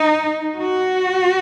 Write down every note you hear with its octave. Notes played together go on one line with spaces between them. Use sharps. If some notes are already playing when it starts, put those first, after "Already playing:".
Already playing: D#4
F#4